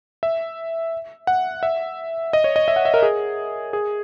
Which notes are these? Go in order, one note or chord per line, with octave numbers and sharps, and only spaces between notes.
E5
F#5
E5
D#5
C#5
D#5
E5
F#5
E5
A#4
G#4
G#4